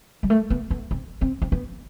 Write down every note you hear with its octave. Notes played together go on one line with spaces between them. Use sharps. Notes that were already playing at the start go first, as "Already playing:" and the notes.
G3
A3
B3
B3
C4
C4
C4
B3